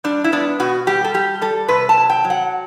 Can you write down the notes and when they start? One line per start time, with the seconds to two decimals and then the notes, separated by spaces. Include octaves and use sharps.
0.04 G3 D4
0.24 E4
0.32 B3 D4
0.60 B2 F#4
0.87 G3 G4
1.04 A4
1.14 G3 G4
1.41 G3 A4
1.68 C3 B4
1.89 A5
1.97 F#3
2.10 G5
2.24 F#3
2.30 F#5